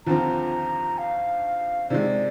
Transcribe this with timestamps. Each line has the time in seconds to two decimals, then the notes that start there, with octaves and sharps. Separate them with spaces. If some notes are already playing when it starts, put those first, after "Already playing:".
0.06 D#2 D3 F3 C4 F4 A#5
0.98 F5
1.90 C3 D#3 G#3 D5